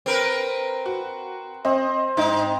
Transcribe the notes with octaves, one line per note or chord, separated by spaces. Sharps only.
C4 A#4 B4
F#4
C4 D#5
G#2 D#4 D#5